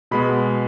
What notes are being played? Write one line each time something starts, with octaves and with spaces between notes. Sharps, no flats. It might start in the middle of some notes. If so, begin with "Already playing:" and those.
B2 G#3 B3 B5